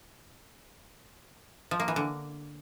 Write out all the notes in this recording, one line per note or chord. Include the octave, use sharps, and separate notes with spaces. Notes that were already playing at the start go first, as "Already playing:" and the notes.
F3
A#3
E3
D3